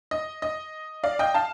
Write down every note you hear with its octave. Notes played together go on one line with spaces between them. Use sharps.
D#5
D#5
D5 F5
D#5 G5
F5 A5